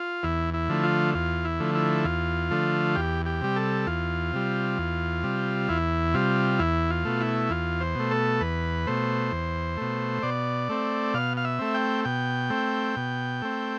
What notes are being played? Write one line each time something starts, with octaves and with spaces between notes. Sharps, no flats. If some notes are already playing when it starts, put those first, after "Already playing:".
Already playing: F4
E2 E4
E4
D3 F3 A3
F4
E2 F4
E4
D3 F3 A3
E4
E2 F4
D3 F3 A3
E2 G4
G4
C3 G3
A4
E2 F4
C3 G3
E2
C3 G3
E2 E4
C3 G3 F4
E2 E4
F4
B2 A3
E4
E2 F4
C5
B2 A3
A4
E2 B4
B2 A3 C5
E2
B2 A3
B2 D5
A3 C4
B2 F5
F5
E5
A3 C4
G5
B2 G5
A3 C4
B2
A3 C4